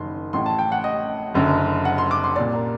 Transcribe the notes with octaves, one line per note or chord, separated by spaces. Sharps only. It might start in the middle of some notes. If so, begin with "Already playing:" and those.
Already playing: F#1 F#2 D#3 C6
A1 A2 C6
A5
G5
F#5
D#5
F#1 F#2 D3
F#5
C6
D6
C6
C2 A#2 D5
A#4